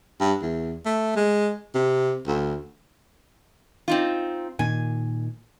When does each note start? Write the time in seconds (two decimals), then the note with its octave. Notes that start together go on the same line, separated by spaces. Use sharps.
0.21 G2
0.42 E2
0.85 A3
1.16 G#3
1.75 C3
2.27 D2
3.88 C4 D#4 F4
4.59 A#2 D#3 G#5